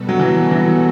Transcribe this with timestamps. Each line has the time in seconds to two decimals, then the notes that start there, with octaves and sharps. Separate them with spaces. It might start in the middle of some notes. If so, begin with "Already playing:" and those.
Already playing: B2 G3 B3 F#4 A4
0.09 F#3
0.20 E3
0.51 E3